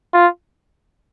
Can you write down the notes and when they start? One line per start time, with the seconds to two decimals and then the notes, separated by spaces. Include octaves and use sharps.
0.14 F4